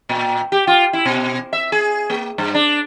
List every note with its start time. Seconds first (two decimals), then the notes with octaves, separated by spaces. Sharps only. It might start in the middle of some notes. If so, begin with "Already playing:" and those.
0.09 A#2
0.52 G4
0.67 F4
0.93 E4
1.05 B2
1.53 E5
1.72 G#4
2.10 A#3
2.38 G2
2.54 D4